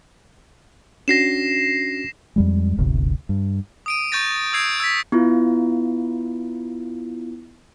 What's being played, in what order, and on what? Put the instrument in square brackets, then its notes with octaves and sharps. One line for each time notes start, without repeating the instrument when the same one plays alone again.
[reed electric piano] C#4 D4 F#4 [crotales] A#6 C7 E7
[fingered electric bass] F2 G3 G#3
D1 G1 D2 C3
G2
[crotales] D#6 D7 D#7
C#6 G6 A6 A#6
D#6 E6 G#6 C7 D7
E6 G#6 B6
[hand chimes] B3 E4 F4